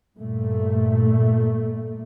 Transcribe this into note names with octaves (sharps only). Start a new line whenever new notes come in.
G2 A#2 A3